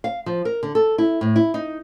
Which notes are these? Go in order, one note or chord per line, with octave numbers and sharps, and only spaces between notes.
F5
F3
A#4
D3
A4
E4
A2
E4
D#4